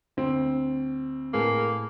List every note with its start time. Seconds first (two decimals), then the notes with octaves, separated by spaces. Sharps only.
0.17 D2 C4
1.34 A2 A#3 G#4 B4